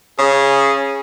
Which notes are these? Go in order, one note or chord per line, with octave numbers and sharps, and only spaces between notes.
C#3 G#4